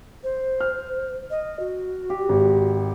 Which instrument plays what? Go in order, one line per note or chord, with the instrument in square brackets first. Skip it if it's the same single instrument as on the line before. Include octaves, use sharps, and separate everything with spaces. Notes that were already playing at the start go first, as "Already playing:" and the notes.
[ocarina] C5
[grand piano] F6
[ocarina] D#5
F#4
[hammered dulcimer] G4
[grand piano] G#1